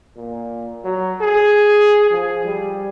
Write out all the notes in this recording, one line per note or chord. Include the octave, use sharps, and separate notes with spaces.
A#2
F#3
G#4
F3
G3